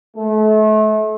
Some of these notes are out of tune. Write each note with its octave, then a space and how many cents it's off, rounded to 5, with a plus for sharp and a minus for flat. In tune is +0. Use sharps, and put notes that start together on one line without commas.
A3 -35